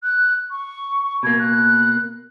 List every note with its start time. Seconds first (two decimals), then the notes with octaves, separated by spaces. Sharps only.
0.03 F#6
0.50 C#6
1.23 B2 A#3 G#6
1.39 F#6